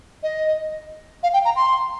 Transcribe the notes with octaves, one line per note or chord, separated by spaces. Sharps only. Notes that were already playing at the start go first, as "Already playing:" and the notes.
D#5
F5
G5
A#5
C6